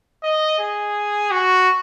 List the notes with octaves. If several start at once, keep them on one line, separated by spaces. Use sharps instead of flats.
D#5
G#4
F#4